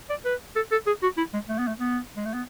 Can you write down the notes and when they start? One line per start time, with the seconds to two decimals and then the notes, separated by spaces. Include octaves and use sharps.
0.10 D5
0.25 B4
0.56 A4
0.72 A4
0.87 G#4
1.03 F#4
1.17 E4
1.34 G#3
1.49 A3
1.58 B3
1.68 A3
1.80 B3
2.16 G#3
2.25 A3
2.34 B3